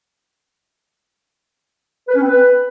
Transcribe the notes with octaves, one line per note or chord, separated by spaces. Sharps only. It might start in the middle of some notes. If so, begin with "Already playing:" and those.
B4
C#4
C4
B4